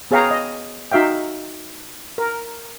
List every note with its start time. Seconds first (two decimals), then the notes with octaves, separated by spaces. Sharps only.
0.11 B3 G#4 C#5 F5 G5 A#5
0.31 D#5
0.91 D#4 F#4 E5 F5 G5
2.18 A#4